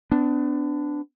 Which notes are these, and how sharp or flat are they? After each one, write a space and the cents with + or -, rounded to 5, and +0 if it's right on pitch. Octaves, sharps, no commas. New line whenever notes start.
B3 +40 D4 +0